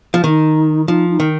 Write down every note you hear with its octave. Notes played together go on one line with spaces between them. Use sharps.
F3
D#3 D#4
F3 D#4
D#4
D#3